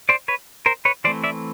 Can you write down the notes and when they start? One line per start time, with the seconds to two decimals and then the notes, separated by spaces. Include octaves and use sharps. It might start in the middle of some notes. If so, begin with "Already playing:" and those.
0.09 C5 D5
0.28 B4 C#5
0.66 A#4 C5
0.85 B4 C#5
1.04 E3 A3 C4 C5 D5
1.24 D5 E5